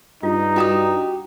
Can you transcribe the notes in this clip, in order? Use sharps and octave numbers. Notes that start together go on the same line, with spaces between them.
G2 D#4 F4
E4 F#4 G4 A#5 D#6